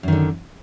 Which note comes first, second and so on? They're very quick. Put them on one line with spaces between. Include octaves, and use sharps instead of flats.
F#2 D#3 D3